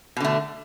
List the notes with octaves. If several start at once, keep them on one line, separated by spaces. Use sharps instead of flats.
B2 D3 A3